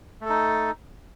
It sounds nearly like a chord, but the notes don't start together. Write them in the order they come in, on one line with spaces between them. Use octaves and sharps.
A3 A4 D#4